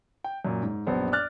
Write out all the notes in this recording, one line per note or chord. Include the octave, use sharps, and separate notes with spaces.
G5
F#2 A#2
G#2
A#1 F#2 B3 C5
D5 D6 F6 F#6 A6